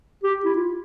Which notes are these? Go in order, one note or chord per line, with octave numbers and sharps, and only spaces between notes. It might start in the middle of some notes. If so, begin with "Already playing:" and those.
G4
E4
F4